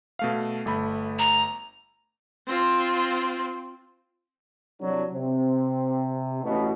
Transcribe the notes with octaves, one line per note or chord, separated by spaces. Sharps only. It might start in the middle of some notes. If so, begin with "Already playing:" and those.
B2 A3 F5
G1 A3 B5
A#5
C4 F4
C2 F#3 D4
C3 C4
A1 B2